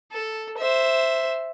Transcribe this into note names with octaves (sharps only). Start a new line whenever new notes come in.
A4
C5 E5